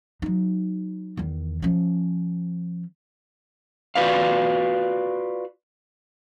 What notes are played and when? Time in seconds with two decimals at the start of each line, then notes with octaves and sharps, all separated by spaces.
0.22 F#3 D#4
1.17 E2 D#3
1.62 F3 C#4
3.95 F4 F#4 B4 D5 F5